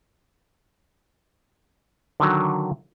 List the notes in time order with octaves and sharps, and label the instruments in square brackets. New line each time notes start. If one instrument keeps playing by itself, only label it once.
[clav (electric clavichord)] D3 D#3 F#3